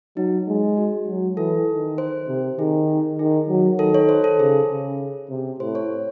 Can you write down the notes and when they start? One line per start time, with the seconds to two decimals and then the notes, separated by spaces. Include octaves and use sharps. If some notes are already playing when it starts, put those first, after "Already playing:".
0.17 F#3 D#4
0.48 G#3
0.77 F#4
1.08 F#3
1.37 E3 A4
1.68 D#3
1.98 C5
2.28 C3
2.58 D#3 G#4
3.19 D#3 G#4
3.49 F#3
3.79 D#3 A4
3.94 C#5
4.09 C5
4.24 A4
4.39 C#3 G#4
4.70 C#3
5.30 C3
5.60 A2 C5
5.75 C#5